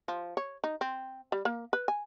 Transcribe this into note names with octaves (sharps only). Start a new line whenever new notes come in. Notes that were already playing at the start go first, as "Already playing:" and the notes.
F3
C#5
D#4
C4
G3
A#3
B4
G#5